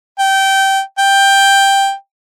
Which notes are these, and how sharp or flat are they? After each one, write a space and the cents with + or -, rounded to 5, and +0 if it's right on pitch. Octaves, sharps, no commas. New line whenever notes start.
G5 -15
G5 +5